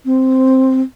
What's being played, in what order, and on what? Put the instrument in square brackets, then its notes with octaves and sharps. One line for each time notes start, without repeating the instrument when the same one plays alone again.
[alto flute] C4